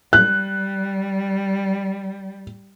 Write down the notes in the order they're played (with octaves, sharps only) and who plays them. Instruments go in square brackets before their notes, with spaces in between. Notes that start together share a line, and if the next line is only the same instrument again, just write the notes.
[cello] G3 [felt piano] F#6